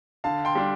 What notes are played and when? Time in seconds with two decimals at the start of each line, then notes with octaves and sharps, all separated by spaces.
0.24 D3 F5 A5
0.45 G5 C6
0.55 G3 D4